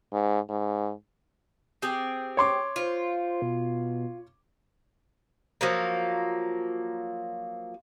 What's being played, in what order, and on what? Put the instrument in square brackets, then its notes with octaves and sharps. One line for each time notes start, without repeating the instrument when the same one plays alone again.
[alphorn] G#2
G#2
[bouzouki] C4 G4 G#4
[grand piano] C#5 C6 D6
[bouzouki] F4 [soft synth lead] C5
[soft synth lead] B2
[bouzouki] F3 F#3 A#3